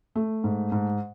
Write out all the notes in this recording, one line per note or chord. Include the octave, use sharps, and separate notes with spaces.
A3
G#2
G#2